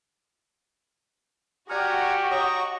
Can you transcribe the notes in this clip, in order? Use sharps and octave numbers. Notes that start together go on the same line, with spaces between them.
F#4 G4 D5 F#5 G#5 A#5 F6
C#5 D#5 A#5 C#6 D#6